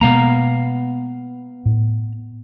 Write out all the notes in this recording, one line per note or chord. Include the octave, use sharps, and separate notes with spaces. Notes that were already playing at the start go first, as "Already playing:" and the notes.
B2 G#3 A#3 B3 F5 A#5
A2